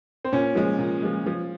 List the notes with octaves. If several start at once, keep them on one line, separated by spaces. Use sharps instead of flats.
C4
A#2 C#4
F3 G#3
A#2
F3 G#3
F3